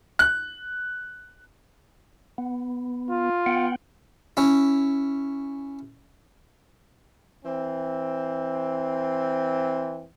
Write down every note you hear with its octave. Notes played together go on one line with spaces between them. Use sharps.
F#6
B3
F4
B3 F#5 G5
C#4 E4
E3 C4